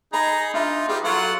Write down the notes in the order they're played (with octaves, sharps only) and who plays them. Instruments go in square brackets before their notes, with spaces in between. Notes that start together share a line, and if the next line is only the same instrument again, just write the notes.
[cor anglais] D#4 [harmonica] G#4 A#5 [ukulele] A#4 D#5 B5
[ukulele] D4 E5 B5 [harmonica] F4
[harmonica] G3 F4 [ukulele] G#4 B4 E5
[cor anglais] F#3 [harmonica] F4 F#5 [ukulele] A4 F5